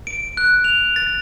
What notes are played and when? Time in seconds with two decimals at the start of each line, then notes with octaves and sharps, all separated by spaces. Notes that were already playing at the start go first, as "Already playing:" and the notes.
0.07 D7
0.37 F#6
0.64 F7
0.96 A6